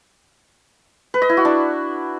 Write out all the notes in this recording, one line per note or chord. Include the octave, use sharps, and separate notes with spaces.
B4
D#5
E4
F#4
D4